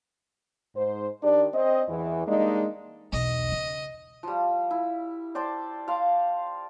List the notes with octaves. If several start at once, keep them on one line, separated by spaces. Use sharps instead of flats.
G#2 C5
D#3 D4 G4 D5
C4 D#5
E2 E3
G3 G#3 A#3 D4 D#4
B1 E2 D#5
C#3
F3 G3
E4
C5 D5 G5 A5
F5 A5 C6 D6